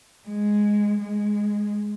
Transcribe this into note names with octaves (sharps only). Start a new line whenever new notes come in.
G#3
G#3